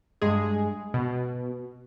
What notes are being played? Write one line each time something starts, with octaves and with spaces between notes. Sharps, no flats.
G2 G#3 G#4
B2